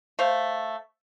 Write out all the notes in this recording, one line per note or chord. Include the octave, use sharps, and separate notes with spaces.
A3 C5 F5